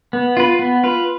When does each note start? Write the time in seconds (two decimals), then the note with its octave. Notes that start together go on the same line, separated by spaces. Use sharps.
0.13 B3
0.37 F4 B4
0.59 B3
0.84 F4 B4